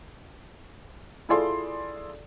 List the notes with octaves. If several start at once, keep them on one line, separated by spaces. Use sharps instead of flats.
E4 F4 G#4 A4 D5 C6